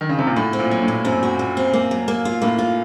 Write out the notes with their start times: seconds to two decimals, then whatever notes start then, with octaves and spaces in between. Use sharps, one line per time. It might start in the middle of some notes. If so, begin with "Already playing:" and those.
0.01 D#3
0.09 C#3
0.19 C3
0.27 A#2
0.36 A2 F#4
0.53 C4
0.59 A#2
0.71 F#3
0.83 A2
0.88 A#2
1.04 F#2 C4
1.23 F#4
1.39 A#2
1.57 C4
1.73 A#3
1.91 F#3
2.08 A#3
2.25 F4
2.42 A2 A#3
2.58 F4